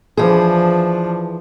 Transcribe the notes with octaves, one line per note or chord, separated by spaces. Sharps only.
E3 F3 D4 G#4